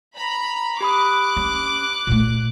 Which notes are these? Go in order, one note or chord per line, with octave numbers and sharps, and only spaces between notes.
A#5 B5
G4 B5 D6 D#6 F#6
C#4
A#2 A3